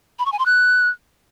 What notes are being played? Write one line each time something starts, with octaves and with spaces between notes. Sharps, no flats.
B5
C#6
G#5
C6
F#6